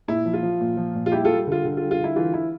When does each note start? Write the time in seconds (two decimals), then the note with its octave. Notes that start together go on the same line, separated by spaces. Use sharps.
0.08 A#2 E4
0.25 F3
0.33 F4
0.43 F3
0.61 A#2
0.77 F3
0.95 A#2
1.06 F4
1.12 G3 E4 G4
1.25 F4 A4
1.30 G3
1.47 D3 F4
1.65 D3
1.77 F4
1.82 G3
1.91 F4
1.99 D3 E4
2.16 E3 F4
2.34 E3 E4